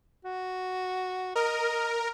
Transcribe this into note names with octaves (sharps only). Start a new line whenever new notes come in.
F#4
A#4 D#5